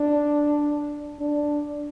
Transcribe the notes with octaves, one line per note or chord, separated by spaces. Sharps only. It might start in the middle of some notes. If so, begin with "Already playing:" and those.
Already playing: D4
D4